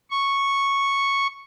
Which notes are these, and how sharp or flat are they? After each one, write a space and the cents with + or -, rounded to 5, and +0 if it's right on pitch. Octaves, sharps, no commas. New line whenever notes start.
C#6 -5